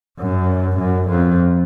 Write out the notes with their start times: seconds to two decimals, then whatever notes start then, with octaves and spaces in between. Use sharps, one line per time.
0.20 F#2
0.79 F#2
1.09 F2